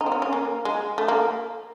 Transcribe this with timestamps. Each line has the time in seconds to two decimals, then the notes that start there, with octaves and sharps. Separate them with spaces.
0.01 D#4
0.06 C4
0.12 C#4
0.22 C#4
0.33 A#3
0.65 G#3
0.98 A3
1.08 A#3